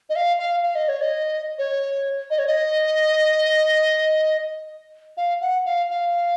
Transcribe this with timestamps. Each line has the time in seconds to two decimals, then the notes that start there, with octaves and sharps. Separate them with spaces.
0.09 D#5
0.15 F5
0.39 F5
0.63 F5
0.75 D#5
0.88 C#5
1.01 D#5
1.58 C#5
2.30 D#5
2.38 C#5
2.47 D#5
5.17 F5
5.41 F#5
5.65 F5
5.90 F5